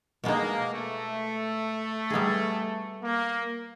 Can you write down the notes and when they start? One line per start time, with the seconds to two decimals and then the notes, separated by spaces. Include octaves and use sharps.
0.24 B2 G#3 A#3 B3 D#4
0.72 A3
2.10 G3 B3 D#4 G#4
3.03 A#3